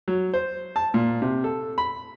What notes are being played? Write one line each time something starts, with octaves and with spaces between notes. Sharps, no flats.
F#3
C5
A5
A#2
C3
A4
B5